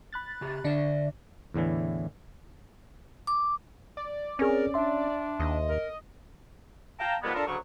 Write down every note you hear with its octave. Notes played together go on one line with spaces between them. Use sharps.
B5 F#6 A6
C#3 G4
D3 D4 D5 E5
E2 A2 D3 E3
D6
D5
C4 C#4 G#4 A#4
D4 E5 C6
D#2 D#5
A#4
F5 G5 A5 A#5
D#3 F3 G3 G#3 B3
D4 F4 A4 A#4
D2 C#3 F#3 C#6